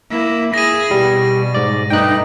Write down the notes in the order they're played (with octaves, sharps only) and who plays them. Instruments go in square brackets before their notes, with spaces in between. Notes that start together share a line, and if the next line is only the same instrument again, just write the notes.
[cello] A#3 E4
[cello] E4 G#4 [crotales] A#6 D#7
[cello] B2 [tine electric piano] G3
[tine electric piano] G#2 D5
[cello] G2 A3 [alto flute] D#4 [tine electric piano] G5 F#6